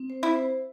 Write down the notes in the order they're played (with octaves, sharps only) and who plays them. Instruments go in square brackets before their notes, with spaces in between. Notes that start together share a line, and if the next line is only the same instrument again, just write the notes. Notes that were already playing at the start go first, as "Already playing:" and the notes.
Already playing: [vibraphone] C4
C5
[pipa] E4
[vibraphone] C5